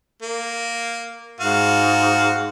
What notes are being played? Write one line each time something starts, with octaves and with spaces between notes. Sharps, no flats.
A#3
G#2 F#4 F5